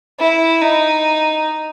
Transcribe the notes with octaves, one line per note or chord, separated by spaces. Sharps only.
E4
D#4